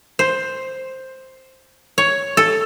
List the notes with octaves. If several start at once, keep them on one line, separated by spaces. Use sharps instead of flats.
C5
C#5
A4